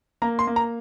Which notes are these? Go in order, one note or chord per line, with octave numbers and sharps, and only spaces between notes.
A#3 A#5
C6
A#3
A#5